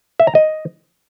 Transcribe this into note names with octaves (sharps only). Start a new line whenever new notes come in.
E5
A#5
D#5